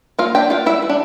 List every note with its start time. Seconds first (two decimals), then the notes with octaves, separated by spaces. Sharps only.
0.19 A#3 F4 F5
0.35 D4 G4 G5
0.50 A#3 F4 F5
0.66 G3 E4 E5
0.82 E3
0.90 D4